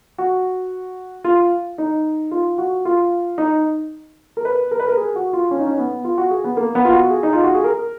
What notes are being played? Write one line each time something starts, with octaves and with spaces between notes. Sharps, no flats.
F#4
F4
D#4
F4
F#4
F4
D#4
A#4
B4
A#4
B4
A#4
G#4
F#4
F4
C#4
D#4
C#4
B3
F4
F#4
G#4
B3
A#3
B3
F4
F#4
G#4
D#4
F4
F#4
G#4
A#4